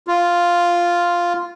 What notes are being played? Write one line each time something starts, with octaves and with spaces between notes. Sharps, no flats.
F4